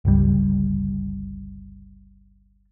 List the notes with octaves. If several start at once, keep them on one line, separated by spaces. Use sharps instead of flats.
G1 C#2 G3